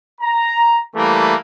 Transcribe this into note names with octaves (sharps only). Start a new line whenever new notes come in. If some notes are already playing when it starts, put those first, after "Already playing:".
A#5
E3 G3 A3 A#3